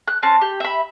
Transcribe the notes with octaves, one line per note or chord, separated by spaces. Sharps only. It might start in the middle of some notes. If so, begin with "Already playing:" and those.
F#6
C4 C#4 A5
G4
E5 B5